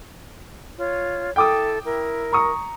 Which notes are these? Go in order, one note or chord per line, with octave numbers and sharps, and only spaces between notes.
F4 C#5
E4 A4 G5 D6 D#6
E4 A#4
A#5 C#6 D#6